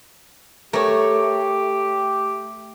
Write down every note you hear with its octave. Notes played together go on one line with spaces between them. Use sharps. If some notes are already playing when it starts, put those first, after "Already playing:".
A3 G4 A#4 C#5